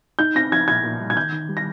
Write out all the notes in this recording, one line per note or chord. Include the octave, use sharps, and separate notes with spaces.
D#4 G6
C4 A#6
F3 G#6
A#2 G#6
A#2
G3
G#6
D#3 G6
D#3
G3
A#6